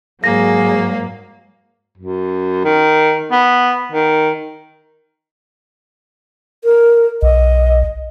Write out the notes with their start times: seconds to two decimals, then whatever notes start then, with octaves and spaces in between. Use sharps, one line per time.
0.24 G#2 F#3 A#3 G#4 A#6
1.98 F#2
2.65 D#3
3.32 B3
3.92 D#3
6.64 A#4
7.22 B1 D#5